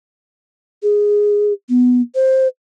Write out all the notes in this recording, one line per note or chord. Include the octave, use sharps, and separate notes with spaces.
G#4
B3
C5